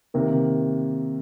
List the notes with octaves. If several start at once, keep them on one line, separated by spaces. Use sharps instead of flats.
C3 D#3 A#3